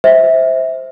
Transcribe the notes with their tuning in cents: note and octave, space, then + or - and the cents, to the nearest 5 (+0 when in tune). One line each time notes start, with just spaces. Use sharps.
C5 +0 E5 -20